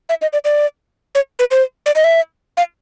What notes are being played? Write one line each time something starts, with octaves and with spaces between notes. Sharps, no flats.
E5
D#5
D5
D5
C#5
B4
C5
D5
D#5
E5
F5